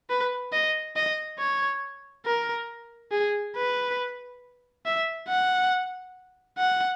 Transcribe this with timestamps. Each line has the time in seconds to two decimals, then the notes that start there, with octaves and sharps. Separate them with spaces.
0.10 B4
0.53 D#5
0.96 D#5
1.40 C#5
2.26 A#4
3.12 G#4
3.56 B4
4.86 E5
5.29 F#5
6.58 F#5